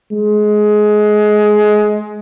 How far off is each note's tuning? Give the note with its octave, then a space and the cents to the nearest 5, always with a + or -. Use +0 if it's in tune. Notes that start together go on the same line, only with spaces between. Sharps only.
G#3 +20